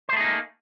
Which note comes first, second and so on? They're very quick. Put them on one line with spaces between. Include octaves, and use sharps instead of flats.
C5 A3 G#4 D#4 A#3